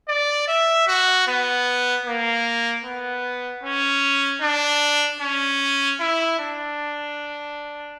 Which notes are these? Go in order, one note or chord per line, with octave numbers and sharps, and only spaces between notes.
D5
E5
F#4
B3
A#3
B3
C#4
D4
C#4
E4
D4